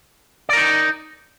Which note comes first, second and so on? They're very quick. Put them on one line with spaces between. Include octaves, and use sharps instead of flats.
D5 A#4 D#4